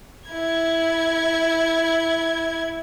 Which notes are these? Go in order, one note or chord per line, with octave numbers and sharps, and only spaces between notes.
E4 G#6